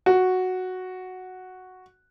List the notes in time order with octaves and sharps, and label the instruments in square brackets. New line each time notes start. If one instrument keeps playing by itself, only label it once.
[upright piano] F#4